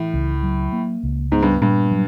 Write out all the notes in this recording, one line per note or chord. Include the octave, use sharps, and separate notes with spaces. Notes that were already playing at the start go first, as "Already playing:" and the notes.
Already playing: A2 E3
C#2
F#3
A#3
C#2
G#2 B3
G2
G2 A#2
F#3